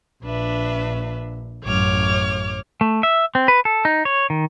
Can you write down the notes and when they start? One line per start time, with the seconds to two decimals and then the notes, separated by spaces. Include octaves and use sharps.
0.24 A#1 D4 B4 E5
1.64 A1 F#2 C#5 D6 F6
2.81 A3
3.03 E5
3.35 C4
3.48 B4
3.65 A4
3.85 D#4
4.05 C#5
4.30 D#3